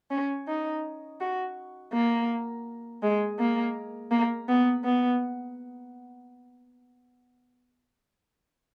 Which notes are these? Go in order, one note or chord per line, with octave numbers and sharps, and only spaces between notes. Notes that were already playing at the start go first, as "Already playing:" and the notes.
C#4
D#4
F#4
A#3
G#3
A#3
A#3
B3
B3